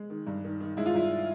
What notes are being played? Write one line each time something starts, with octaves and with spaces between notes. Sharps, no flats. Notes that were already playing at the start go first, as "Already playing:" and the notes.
Already playing: G#3
D#3
G2
D#3
D#3
G#3 E4
F4
G2 E4